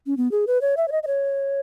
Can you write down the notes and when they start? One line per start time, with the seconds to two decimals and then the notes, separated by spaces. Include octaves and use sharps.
0.06 C#4
0.17 B3
0.31 G#4
0.47 B4
0.61 C#5
0.77 E5
0.88 C#5
0.92 D#5
1.03 D#5
1.07 C#5